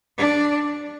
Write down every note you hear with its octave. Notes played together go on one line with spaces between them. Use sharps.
D4